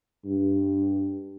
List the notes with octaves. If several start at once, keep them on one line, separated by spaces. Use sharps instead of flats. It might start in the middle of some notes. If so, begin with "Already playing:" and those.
G2